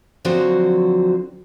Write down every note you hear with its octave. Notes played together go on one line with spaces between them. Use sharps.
D3 F3 F#3 C4 F#4 C5